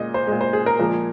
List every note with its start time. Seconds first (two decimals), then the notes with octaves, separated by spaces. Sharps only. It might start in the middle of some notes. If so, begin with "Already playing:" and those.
Already playing: A#2 G#3 D#5
0.14 C5
0.27 A#2 G#3
0.41 C5
0.53 G#4
0.66 A#4
0.79 A#2 F3 G#3 A#4